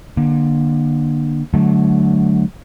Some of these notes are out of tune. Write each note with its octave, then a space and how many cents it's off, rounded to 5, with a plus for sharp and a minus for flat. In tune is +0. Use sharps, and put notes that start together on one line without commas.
D3 +30 A#3 +35
D3 +0 F#3 +0 A3 -25